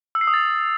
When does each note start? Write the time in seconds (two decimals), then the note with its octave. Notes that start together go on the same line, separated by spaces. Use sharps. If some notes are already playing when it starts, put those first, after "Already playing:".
0.15 E6
0.21 C7
0.27 D#6
0.34 A6